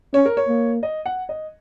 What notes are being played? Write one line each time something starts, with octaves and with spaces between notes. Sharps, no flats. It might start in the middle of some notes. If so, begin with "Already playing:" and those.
C#4 C#5
A#4
C#5
A#3
D#5
F#5
D#5